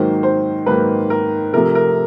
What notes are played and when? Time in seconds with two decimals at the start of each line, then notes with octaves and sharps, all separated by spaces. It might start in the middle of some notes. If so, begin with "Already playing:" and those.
Already playing: G#2 D#3 F#3 A#3 C5
0.23 C5
0.66 G#2 D#3 F#3 A#3 B4
1.10 A#4
1.54 C3 F3 A3 A#4
1.75 A#4